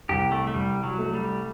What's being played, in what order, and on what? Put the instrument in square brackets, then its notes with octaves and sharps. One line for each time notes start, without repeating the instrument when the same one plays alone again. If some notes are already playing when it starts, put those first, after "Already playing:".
[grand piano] C2 [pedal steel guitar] G4
[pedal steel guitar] A3
A3
[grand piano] C2 [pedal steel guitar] G3
[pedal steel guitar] F#3
[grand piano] A3
[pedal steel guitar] G3